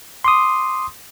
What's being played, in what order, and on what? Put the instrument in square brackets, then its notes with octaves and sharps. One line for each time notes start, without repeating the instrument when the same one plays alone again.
[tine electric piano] C6 D6 D#6